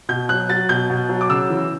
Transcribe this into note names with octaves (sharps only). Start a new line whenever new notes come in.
B2 G6
F#3 F#6
F#3 A6
B2 G6
B2
F#3
D6
C#3 E6
E3